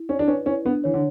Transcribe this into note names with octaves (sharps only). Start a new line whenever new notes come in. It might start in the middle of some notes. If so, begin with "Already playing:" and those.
Already playing: E4
C#4 D5
D4
C#4 B4
C#4 E4
B3 D4
E3 C#5
D3